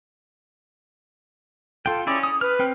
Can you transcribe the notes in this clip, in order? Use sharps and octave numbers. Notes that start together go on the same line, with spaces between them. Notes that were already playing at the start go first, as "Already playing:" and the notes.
F4 A4 G5
C#4 E4 G#4 D5
D#6
B4 F6
C4 G5 F6